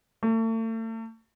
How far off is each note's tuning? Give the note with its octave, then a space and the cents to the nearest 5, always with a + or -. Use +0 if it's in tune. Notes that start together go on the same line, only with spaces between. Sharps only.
A3 +40